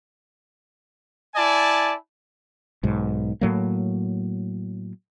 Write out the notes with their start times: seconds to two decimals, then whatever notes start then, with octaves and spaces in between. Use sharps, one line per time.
1.35 E4 D5 G#5 A5
2.84 B1 G#2
3.41 A2 F#3 A#3